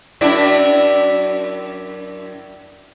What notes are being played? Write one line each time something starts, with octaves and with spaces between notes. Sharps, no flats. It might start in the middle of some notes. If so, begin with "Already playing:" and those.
F#2 D4 E4